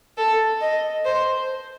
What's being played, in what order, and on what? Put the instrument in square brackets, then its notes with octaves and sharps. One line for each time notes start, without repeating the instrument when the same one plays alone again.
[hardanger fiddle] A4
D#5
C5